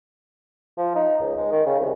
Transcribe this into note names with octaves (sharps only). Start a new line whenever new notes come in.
F3
D#4
C#2
G#3
D#3
C#3
C2